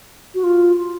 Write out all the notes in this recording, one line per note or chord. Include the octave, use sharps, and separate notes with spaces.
F#4
F4